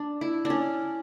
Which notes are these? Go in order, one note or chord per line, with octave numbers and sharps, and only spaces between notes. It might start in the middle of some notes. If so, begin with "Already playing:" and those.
Already playing: D4
E4
D4
C#4